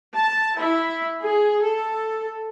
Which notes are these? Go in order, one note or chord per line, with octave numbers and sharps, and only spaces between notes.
A5
E4
G#4
A4